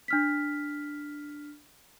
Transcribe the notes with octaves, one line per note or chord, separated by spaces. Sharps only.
D4 F6 B6